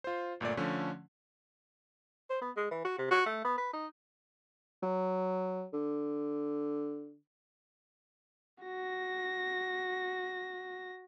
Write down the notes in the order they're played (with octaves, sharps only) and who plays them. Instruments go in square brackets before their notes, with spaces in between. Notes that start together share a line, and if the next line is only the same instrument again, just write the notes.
[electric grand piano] F4 C5
G1 A#2 A3 D5
D3 F3 A3 C#4
[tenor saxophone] C5
B3
G#3
E3
F#4
C3
F#4
A3
B3
B4
D#4
[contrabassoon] F#3
D3
[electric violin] F#4 A#6